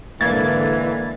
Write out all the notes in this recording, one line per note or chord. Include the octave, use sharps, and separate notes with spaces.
G#2 D3 E3 A#3 G#6 A6